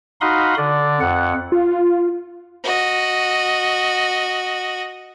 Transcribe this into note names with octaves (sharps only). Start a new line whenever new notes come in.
D#4 F#4 F5 B5 C6 D#6
D3 D5
F2 F#5
F4
F#4 D#5